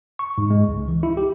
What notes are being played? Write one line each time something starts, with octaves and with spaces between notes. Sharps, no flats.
C#6
G#2
G#3
C#2
E3
E4
G4